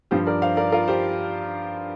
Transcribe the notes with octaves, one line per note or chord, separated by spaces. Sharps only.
G2 F3 G4 C5
A#4 D5
C5 F5
A#4 D5
F4 A#4
G4 C5